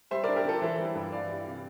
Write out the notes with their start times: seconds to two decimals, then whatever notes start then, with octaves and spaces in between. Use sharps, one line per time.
0.11 G3 C5 E5
0.24 A#4 D5
0.28 D4
0.36 G4 A#4
0.45 D3 F4 A4
0.62 E3 C5 E5
0.79 G3
0.95 G2
1.12 E3 D5 F5
1.29 G3
1.46 C3